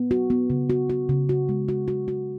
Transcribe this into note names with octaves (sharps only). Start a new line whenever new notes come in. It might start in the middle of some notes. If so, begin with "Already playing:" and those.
Already playing: B3
F#4
B3
C#3
F#4
F#4
C#3
F#4
G#3
F#4
F#4
F#4